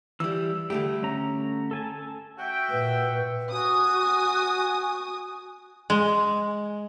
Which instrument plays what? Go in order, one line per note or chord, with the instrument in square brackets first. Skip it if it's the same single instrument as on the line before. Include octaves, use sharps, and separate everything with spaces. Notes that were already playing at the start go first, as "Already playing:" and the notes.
[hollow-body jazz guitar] E3 G3 [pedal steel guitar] E6
[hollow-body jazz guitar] D3 A3 G4 [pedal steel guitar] G3
[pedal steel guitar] C#4 A#5
A4 G#5 A5
[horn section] F#4 E5 G5
[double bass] A#2 [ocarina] B4
[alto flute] F#4 [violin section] G#5 D#6
[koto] G#3